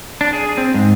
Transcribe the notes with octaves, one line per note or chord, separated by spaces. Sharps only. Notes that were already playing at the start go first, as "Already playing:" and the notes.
D4
G#4
C4
G#2